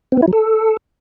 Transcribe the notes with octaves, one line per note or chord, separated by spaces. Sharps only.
C4
B3
E4
F#3
A4